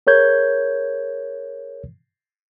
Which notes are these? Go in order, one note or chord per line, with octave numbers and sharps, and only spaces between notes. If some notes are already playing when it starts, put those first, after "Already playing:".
G#4 A#4 C#5 G6 G#6